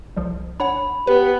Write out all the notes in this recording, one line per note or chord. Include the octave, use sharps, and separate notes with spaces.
C2 F3 G3
D4 C#5 F#5 B5
B3 G4 B4